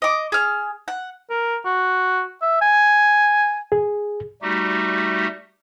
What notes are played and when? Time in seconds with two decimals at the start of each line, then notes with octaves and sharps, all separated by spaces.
0.02 D#5 D6
0.32 G#4 F6
0.88 F#5
1.30 A#4
1.65 F#4
2.42 E5
2.62 G#5
3.72 G#4
4.42 G3 A3 D#4 F#4 G4